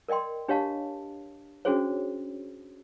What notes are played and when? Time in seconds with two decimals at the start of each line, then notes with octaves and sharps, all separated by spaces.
0.08 A#4 D5 D#5 G5 C6
0.48 D4 G4 C#5 D#5 F5 A5
1.65 C#4 D4 F#4 G#4 C5 C#5